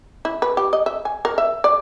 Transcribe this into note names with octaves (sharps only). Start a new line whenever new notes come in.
E4
B4
G4
D#5
E5
G#5
A#4
E5
D5